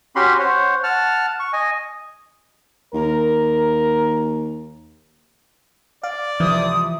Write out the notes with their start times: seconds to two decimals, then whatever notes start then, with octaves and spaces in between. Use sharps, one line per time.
0.16 C#4 F#4 G4 B5 C6
0.39 C5 C#5 F#5
0.84 F#5 A5 F6
1.40 C#6
1.53 D#5 G#5
2.94 D#2 A#4
6.04 D5 F5
6.40 C#2 C3 E3 F3 E4 D#6